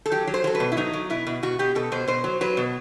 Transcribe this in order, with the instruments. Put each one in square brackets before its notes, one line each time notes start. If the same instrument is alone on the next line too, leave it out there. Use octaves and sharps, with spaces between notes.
[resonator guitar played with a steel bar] A4
F#3 G4
F#3
C5
F#3 A4
B4
B2
E4
F#3 D#4
F#3
B2 E4
B2
B2 F#4
B2 G4
B2 A4
B2 C5
B2 C5
F#3
F#3 B4
B2